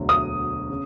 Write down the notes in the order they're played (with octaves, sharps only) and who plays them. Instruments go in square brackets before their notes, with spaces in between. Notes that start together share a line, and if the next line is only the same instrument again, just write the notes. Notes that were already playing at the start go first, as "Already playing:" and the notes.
Already playing: [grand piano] E1 D2 D3 F#3
[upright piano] D#6
[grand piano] C#3